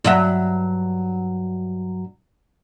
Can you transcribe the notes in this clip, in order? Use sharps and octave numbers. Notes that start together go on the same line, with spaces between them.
G2 F#3 E5